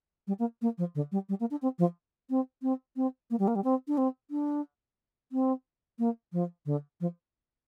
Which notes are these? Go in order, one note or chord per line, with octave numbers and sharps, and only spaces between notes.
G3
A#3
A#3
F3
D3
G3
G3
A#3
D4
C4
F3
C4
C4
C4
A#3
G3
A#3
G3
C4
D4
C4
D4
C4
A#3
F3
D3
F3